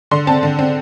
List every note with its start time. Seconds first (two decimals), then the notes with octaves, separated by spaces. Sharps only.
0.11 D3 C6
0.27 C4 A5
0.43 D3
0.59 C4